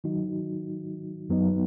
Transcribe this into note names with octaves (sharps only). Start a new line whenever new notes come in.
D#3 F#3 D#4 F#4
F#2 F#3 B3 D#4